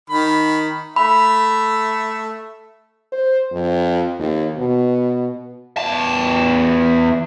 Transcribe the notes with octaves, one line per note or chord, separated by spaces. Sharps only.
D#3 B5
A3 E5 B5
C5
F2
D#2
B2
E2 A5